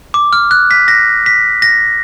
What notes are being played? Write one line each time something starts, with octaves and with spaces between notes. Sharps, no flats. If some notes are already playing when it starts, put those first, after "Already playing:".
D6
F6
F#6
B6
A#6
B6
A#6